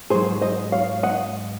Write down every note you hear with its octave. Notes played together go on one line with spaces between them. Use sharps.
G#2 F#3 G#4 C5
C5 D#5
C#5 F5
D#5 F#5